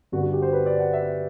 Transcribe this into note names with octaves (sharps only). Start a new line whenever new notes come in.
G1 G2 D3 F#4
F#4
G4
C5
B4
D5
F#5
E5